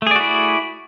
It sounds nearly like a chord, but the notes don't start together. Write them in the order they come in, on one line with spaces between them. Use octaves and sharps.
A3 G#4 D5 F#4 E4